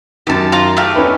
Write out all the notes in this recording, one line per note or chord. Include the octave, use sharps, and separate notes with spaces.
F#2 D#3 G4 A5
F4 F5 A#5
A3 G4 F5
C#4 D#4 B4